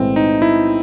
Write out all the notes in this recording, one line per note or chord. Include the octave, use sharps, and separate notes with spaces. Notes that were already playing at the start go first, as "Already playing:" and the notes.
Already playing: B1 A2 E3 G#3 C4
D#4
E4